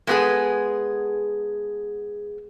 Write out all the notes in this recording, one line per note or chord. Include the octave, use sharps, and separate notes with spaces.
G#3 A3 B3 E4 G#4 A4